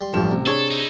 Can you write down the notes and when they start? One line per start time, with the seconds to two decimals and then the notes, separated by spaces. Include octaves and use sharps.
0.01 G3 C6
0.14 A1 G2 D3 F3 G3 E7
0.31 A1 C3
0.47 D4 G#4 A4 C#5
0.71 D#4 E4